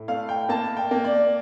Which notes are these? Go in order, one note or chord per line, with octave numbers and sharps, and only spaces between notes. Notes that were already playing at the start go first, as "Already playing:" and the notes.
Already playing: A2
A3 F5
G5
A#3 A5
G5
A#3
D5